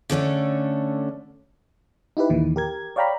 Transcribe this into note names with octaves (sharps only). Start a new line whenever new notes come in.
D3 A3 C#4 D4
D#4 E4 G4 B4
D#2 A#2 D#3 E3
G4 A#4 G#6
C#5 D5 F5 G5 A#5 B5